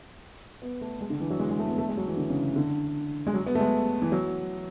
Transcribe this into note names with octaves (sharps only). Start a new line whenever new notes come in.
B3
A3
G#3
D3
E3
F#3
G#3
G#3
A3
B3
A3
G#3
F#3
E3
D3
C#3
D3
G#3
F#3
B3
A3
G#3
E3
F#3